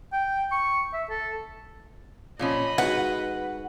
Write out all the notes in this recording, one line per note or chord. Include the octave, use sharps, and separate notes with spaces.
G5
C#6
E5
A4
A#2 F3 C#4 D#5 B5
G#3 D#4 F#4 B4 F#5